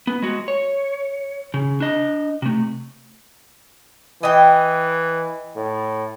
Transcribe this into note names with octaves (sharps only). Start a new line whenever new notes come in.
B3
G#3 F#4
C#5
C#3
D4 D#5
C3 A3
E3 D#5 G5
A2